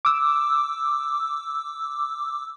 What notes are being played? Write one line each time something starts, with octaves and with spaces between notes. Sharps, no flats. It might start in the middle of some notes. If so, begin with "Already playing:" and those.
D6 E6